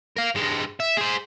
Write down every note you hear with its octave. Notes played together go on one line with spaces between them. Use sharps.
A#4 F5
G2 G#3
E5
G#4 C5